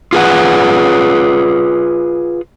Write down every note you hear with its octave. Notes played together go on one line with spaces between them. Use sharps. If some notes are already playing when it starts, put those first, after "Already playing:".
F4 G#4 B4 F#5